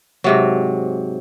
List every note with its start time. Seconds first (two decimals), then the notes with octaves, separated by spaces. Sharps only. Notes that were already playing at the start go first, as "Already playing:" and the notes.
0.24 G#2 C3 F#3